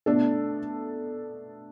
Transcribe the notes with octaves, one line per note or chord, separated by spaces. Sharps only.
B2 A3 D4 A4